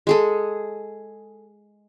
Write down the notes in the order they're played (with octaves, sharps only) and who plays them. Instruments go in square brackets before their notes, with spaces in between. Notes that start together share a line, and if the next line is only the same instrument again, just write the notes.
[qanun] G#3 G#4 A4